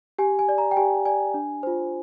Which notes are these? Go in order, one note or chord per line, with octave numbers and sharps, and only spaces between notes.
G4 G#5
G#5
D5
A#5
G5
G4 G#5
D5 G#5
D4
F4 C5